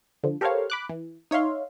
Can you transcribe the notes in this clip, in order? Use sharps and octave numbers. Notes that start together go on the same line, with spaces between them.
D3 F3
G4 A4 A#4 C5 C#5 F5
B5 D6 F#6
E3
D#4 C#5 E5 F5 C6